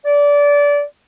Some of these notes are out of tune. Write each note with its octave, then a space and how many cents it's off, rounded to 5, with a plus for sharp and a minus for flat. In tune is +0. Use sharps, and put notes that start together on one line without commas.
D5 -25